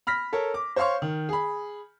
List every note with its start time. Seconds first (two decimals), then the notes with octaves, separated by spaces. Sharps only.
0.07 B5 F6 A#6 B6
0.33 A4 A#4 C#5
0.54 D6
0.76 C5 C#5 F5 C6 C#6
1.02 D#3
1.29 G#4 B5